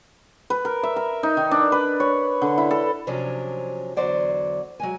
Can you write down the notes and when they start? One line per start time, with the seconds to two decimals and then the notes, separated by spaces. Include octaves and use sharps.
0.50 B4
0.65 A#4
0.83 E5
0.96 A#4
1.23 D#4
1.37 D#3
1.51 D4
1.72 B4
2.00 C#5
2.42 D3
2.58 E4
2.71 A4
3.07 C3 F3 F#3 C#4 D4
3.97 E2 D3 F#3 C5 D5 F#5
4.80 F#3 G#3 G#5